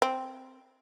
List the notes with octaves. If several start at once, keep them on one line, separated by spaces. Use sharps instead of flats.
C4